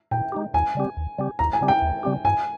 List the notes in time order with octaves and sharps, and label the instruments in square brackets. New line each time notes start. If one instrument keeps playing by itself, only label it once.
[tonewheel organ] A#2 [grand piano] G5
[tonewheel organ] G#3 D#4 G4
[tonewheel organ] D#2 [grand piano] G#5
[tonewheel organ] C#3 G3 C4 G4
D#2
C#3 G3 C4 G4
[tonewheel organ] D#2 [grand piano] A#5
[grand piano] G#5
[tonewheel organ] C#3 G3 C4 G4
[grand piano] G5
[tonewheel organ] D#2
C#3 G3 C4 G4
[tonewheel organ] G2 [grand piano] G#5